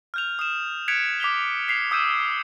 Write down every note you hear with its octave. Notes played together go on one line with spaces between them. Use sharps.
F6 G6 F7
D#6 E7
F#6 G#6 B6 C#7 D7 F7
D6 B6 F7 G7
B6 C7 F7
D#6 E6 G6 G#6 D#7 E7